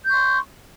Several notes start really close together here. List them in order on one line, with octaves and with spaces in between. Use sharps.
G6 C#6 C6